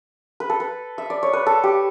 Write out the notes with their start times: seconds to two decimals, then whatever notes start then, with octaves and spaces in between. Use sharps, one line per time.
0.40 B4
0.50 A4
0.60 B4
0.98 E5
1.10 D5
1.23 C#5
1.33 B4
1.46 A4
1.64 G4